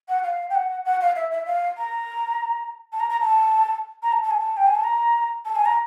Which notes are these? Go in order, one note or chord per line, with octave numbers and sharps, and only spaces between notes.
F#5
F5
G5
F#5
F#5
F5
E5
E5
F5
A#5
A5
A#5
A#5
A5
A#5
A5
A5
G#5
A5
G5
G#5
A5
A#5
A5
G#5
A#5